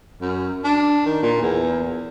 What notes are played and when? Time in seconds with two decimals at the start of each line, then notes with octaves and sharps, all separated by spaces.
0.21 F#2
0.64 D4
1.06 D#3
1.22 A#2
1.42 E2